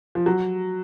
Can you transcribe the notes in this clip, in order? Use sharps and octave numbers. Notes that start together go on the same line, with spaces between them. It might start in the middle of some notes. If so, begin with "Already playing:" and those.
F3
F#3